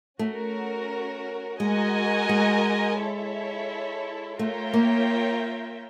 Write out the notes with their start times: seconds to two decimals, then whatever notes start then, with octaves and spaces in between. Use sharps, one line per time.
0.19 A3 C#4 F#4 A#4
1.60 G#3 F#4 A#4 D#5 G#5
2.29 G#3
2.99 E4 A4 C#5 E5
4.39 A3 F4 A#4 C#5 E5 G5
4.73 A#3